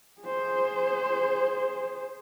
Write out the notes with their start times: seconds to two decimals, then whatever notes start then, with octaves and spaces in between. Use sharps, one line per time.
0.21 G#4 C5